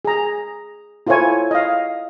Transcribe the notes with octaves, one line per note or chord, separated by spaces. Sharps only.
G#4 A#5
E4 F4 A4 C5 C#5 G#5
D#5 F5